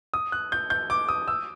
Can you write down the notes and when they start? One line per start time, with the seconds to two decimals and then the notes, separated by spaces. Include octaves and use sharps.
0.14 D#6
0.32 F#6
0.52 G6
0.70 G6
0.90 D6
1.09 D#6
1.27 E6